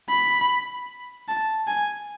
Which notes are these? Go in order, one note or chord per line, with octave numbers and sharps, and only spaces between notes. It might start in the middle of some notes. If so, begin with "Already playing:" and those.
B5
A5
G#5